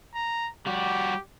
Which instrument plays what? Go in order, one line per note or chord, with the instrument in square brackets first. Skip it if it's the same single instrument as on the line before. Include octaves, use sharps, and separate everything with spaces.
[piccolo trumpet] A#5
[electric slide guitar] G3 F#4 [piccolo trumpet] G4